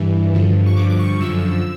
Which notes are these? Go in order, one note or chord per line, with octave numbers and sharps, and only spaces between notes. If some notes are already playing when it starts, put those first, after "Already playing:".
Already playing: G2 E3
G2 D3 F3
C#6
G2 D3 F3 D6
D6
C#6
F#2 D3 F3 E6